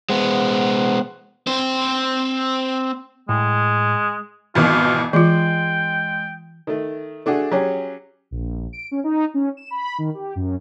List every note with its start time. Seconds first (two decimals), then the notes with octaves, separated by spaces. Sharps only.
0.10 G#3 B3 C5 F#5
1.47 C4 C5
3.29 A2 G#3
4.55 G#1 B2 E3 F4
5.13 E3 G#3 F4 G5
6.67 D#3 A3
7.26 A3 D4 F#4 G#4
7.52 F#3 C#4 G4 G#4
8.31 A#1
8.73 D7
8.91 C#4
9.04 D#4
9.34 C#4
9.57 E7
9.71 B5
9.98 D#3
10.14 G4
10.35 F#2